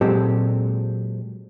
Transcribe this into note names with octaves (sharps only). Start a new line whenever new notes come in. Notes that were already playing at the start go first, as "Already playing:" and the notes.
A#2 F#3 G#3 C4 G4 A4